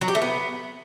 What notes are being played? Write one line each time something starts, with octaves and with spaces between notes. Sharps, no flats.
F#3
G4
A3
B3